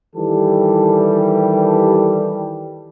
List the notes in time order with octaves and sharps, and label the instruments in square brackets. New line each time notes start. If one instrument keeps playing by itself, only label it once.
[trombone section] D#3 E3 G3 G4 A4